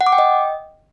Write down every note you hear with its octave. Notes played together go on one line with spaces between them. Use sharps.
F#5
D6
G5
D#5